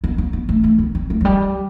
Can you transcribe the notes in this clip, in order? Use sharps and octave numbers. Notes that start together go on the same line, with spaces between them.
B3
B3
B3
A3
A3
B3
C4
A3
F#3
G3